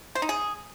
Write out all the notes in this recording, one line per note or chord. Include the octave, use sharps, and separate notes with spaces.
C5
D#4
G#4